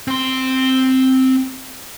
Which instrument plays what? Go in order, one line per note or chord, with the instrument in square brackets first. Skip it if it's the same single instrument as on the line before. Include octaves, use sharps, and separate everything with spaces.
[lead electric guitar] C4 C6